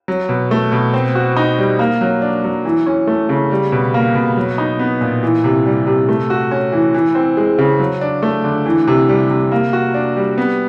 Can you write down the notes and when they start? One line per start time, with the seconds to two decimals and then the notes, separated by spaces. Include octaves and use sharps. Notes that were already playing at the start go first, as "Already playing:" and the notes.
0.08 F#3
0.29 B2
0.51 A3
0.72 B2
0.94 C4
1.15 F#4
1.37 D#4
1.58 G3
1.79 A#3
2.01 F#3
2.22 D4
2.44 F#3
2.65 E3
2.86 C#4
3.07 A3
3.29 C#3
3.51 G3
3.72 B2
3.94 A#3
4.15 B2
4.37 F#3
4.58 D#4
4.79 B3
5.01 A#2
5.23 E3
5.44 C3
5.66 G3
5.87 C3
6.09 A3
6.30 F#4
6.51 C#4
6.72 E3
6.94 E3
7.15 C4
7.37 G#3
7.58 C#3
7.80 F#3
8.01 D4
8.23 A3
8.44 D3
8.66 E3
8.87 C3
9.09 G3
9.30 C3
9.52 A#3
9.73 F#4
9.94 D4
10.16 G3
10.38 B3